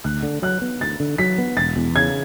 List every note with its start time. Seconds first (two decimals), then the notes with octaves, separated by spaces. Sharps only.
0.04 D2 F#6
0.23 D3
0.42 F#3 F#6
0.62 B3
0.81 D2 A6
1.00 D3
1.18 F#3 B6
1.38 B3
1.57 E1 A6
1.77 E2
1.96 C#3 G#6